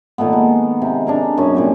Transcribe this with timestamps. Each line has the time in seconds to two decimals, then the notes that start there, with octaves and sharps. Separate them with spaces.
0.18 A#2 D#3 A3 B3
0.33 G#3
0.82 C3
1.07 D4 G#4 A#4
1.38 F#2 B2 C#4 G#5
1.55 A#2 G3 C4